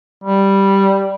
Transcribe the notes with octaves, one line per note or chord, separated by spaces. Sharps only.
G3